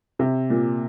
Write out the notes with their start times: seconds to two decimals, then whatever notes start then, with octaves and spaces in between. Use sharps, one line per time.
0.19 C3
0.50 A#2